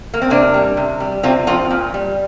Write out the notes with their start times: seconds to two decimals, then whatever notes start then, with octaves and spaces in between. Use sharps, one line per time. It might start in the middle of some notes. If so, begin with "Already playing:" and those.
0.14 A#3
0.22 C4
0.30 C3 A#3 D4
0.54 G3
0.77 C3
1.00 G3
1.23 C3 C4 F4
1.47 F3 C4 F4
1.71 A#2
1.94 G3